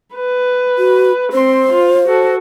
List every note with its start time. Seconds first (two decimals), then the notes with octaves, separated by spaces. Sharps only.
0.14 B4
0.78 F#4
1.33 C4 C5 C6
1.72 F4
2.08 F#4 A4